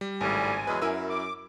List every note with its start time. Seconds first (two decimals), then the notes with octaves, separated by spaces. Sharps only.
0.01 G3
0.21 G#1 A2 C#3 G3 G#5
0.67 E2 F#3 G#3 B4
0.82 F#2 E4 A#4 E6
1.10 D6